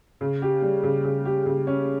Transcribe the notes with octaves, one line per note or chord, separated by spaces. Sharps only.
C#3
G4
G3
C#3
C#3
G4
C#3
C#4